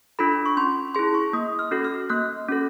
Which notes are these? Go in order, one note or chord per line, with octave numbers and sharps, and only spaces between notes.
D4 F4 A4 B5
C#6
C#4 C6
E4 G#4 C6
C#6
A#3 D#6
F6
C#4 F#4 A4
F6
A#3 F#6
C#4 F#4 A4